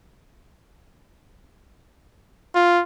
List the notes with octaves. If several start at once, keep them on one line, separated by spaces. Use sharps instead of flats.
F4